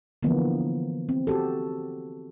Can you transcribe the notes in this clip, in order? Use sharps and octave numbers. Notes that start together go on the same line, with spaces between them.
D3 E3 F3 A#3 B3
C4
F#4 G4 A4